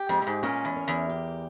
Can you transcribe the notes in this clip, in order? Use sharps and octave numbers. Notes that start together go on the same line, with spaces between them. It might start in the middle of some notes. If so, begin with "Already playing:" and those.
Already playing: G4
F2 G#3
A#2
G#2
A#2 C#4
E2
A#4
E2
G4